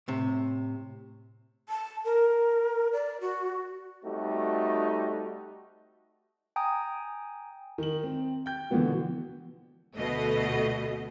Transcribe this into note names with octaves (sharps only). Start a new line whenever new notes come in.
A2 C3
A5
A#4
D5
F#4
G3 A3 C4 D#4 F#4 G4
G5 G#5 A#5 D#6
D#3 F#7
C4
G5 G6
B2 D3 E3 F3 B3 F#4
D2 B2 A3 D#5